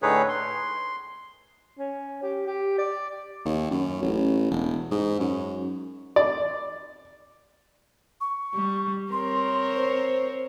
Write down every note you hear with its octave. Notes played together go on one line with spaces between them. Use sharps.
A2 D3 D#4 G#4 B4 C#5
C6
C#4
G4
G4
D5
D#2
F#2
A1
E1
G#2
F#2
D5
C#6
G3
C4 A#4 C#5 C6
C5